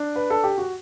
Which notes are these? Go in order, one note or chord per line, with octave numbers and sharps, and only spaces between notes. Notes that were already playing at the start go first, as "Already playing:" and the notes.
Already playing: D4
B4
A4
G4
F#4